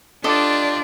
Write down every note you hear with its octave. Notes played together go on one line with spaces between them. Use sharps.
D4 F4 G4 A4 D5 D#5 D6